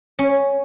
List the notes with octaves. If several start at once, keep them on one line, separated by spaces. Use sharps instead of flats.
C#4